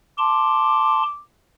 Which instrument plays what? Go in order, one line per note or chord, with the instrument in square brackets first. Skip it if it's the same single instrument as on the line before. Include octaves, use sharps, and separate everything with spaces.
[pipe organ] A5 C6 [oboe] D6